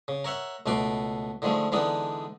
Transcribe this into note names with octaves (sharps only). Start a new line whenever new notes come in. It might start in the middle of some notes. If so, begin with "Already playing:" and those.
C#3
A#4 C#5 E5 F#5
C#2 B2 A3 B4 C6 D6
D3 D#3 F3 G#3 A3
D3 E3 G#3 B3 D4 D#4